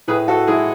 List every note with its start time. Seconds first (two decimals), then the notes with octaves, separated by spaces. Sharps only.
0.08 A2 G#4 B4
0.28 F#4 A4
0.47 G#3 E4 G#4